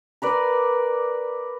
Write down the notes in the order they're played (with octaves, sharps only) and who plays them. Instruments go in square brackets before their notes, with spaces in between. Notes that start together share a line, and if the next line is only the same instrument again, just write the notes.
[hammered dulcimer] A#4 B4 D5